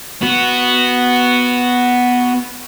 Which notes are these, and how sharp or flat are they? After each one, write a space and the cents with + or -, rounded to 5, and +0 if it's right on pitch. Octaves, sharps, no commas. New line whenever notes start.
B3 +0 F#4 +0